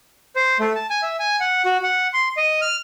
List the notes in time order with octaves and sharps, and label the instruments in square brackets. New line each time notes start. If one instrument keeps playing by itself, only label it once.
[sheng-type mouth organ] C5
A3
A5
G#5
E5
G#5
F#5
F#4
F#5
C6
D#5
F6